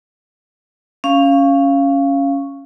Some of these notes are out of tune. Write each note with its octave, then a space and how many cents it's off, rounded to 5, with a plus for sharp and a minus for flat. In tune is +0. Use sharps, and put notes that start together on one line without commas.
C#4 +0 F5 -10